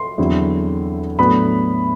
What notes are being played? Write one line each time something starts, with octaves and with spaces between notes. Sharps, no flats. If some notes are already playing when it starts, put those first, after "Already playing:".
Already playing: C6
E2 D3 F#3 C4 E4
A2 F#3 B3 D4 B5